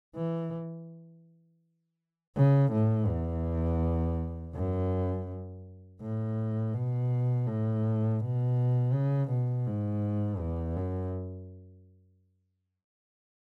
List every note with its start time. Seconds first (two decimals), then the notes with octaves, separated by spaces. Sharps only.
0.15 E3
2.36 C#3
2.72 A2
3.08 E2
4.54 F#2
6.01 A2
6.74 B2
7.47 A2
8.20 B2
8.93 C#3
9.29 B2
9.67 G#2
10.39 E2
10.76 F#2